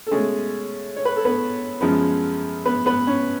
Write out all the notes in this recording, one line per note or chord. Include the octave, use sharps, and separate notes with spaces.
A4
B2 G#3 A3 C#4 G#4
C#5
B4
A4
B3 B4
F#2 F3 G#3 B3
B3 B4
B3 B4
C#4